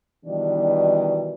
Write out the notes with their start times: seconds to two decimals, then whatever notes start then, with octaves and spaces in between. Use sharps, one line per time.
0.25 B2 D#3 E3 G3 D4